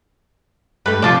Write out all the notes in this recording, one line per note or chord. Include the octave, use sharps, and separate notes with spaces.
G2 A3 B4
C3 F3 D4 F4 A5 D6